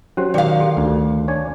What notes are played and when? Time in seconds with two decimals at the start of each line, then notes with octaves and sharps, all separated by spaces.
0.17 F#3 C#4 G4 C5
0.34 D#3 D5 F5 G5 D6
0.60 G4 A4
0.77 D2
1.28 D4 C#5 G#5